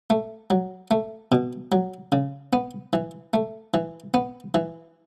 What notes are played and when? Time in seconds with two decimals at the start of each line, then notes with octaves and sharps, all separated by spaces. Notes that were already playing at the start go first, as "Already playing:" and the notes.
0.10 A3
0.50 F#3
0.91 A3
1.32 B2
1.72 F#3
2.12 C#3
2.53 B3
2.93 E3
3.34 A3
3.74 E3
4.14 B3
4.54 E3